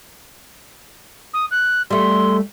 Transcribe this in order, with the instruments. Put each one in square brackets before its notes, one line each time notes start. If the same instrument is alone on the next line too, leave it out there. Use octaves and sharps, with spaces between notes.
[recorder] D#6
F#6
[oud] G3 A3 [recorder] C6